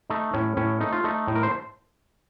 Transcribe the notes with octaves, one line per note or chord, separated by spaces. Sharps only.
A3 D#4
A2 C#4
A2 C#4
A3 D#4
F4
A3 D#4
A2
A#4
C5